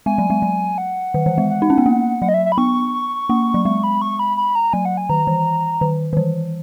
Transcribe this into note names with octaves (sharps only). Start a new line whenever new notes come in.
G#3 G#5
F#3
G#3
F#3
F#5
D#3
E3
G#3
F#5
D#4
C#4
B3
A#3
F#3 F#5
D#5
E5
E5
B5
B3 C#6
A#3
F#3
G#3 C#6
B5
C#6
B5
B5
A#5
F#3 G#5
F#5
G#5
D#3 A#5
E3
D#3
D#3
E3